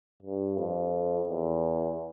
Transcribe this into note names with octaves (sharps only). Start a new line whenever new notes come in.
G2
F2
E2